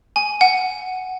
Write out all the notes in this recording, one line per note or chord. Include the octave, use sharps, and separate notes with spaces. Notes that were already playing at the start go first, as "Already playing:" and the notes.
G#5
F#5